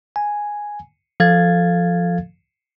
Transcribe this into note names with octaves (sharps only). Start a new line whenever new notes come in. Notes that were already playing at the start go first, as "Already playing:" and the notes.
G#5
F3 A4 F5 G#6 A6